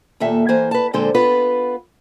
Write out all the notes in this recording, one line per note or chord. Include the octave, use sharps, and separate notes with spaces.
D#2 A#2 A4 E5
E3 A#3 C5 G#5
B4 A5
F2 A#2 D3 G#3 A4 C5
B3 F4 B4